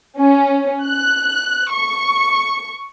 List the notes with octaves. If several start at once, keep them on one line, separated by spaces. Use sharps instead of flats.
C#4
F#6
C#6